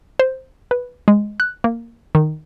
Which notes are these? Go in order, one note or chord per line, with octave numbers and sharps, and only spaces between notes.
C5
B4
G#3
F#6
A#3
D#3